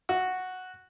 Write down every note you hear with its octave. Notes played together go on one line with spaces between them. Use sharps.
F#4